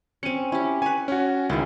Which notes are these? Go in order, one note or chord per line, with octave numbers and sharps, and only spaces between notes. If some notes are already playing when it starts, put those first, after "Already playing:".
C4 C#4 C#7 D#7
C#4 E4 G4
B4 C#5 G#5
C#4 F#4
C#2 D#3 C#4 E4 G#4